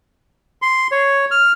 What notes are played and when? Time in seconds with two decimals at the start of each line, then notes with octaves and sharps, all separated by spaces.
0.62 C6
0.92 C#5
1.31 F6